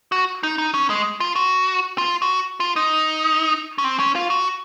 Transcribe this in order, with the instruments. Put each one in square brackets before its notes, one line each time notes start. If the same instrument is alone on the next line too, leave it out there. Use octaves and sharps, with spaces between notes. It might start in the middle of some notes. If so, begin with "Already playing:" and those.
[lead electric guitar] F#4
D#4
D#4
C#4
G#3
F4
F#4
F4
F#4
F4
D#4
C#4
C4
C#4
F4
F#4